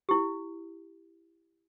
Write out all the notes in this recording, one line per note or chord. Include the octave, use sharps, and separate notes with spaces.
E4 G4